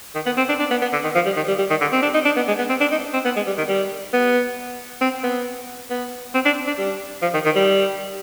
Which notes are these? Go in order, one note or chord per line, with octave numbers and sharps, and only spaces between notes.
D#3
B3
C4
D4
D4
B3
B3
D3
D#3
F3
G3
D#3
G3
G3
D#3
D3
C4
D4
D#4
D4
B3
G#3
B3
C4
D4
D#4
C4
B3
G#3
G3
D#3
G3
B3
C4
B3
B3
C4
D4
D4
G3
F3
D#3
D#3
G3